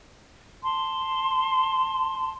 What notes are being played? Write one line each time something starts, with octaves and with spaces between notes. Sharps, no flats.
A5 C6